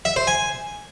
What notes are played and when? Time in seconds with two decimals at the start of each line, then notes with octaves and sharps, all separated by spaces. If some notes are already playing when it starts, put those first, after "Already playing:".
0.05 E5
0.16 C5
0.27 G#5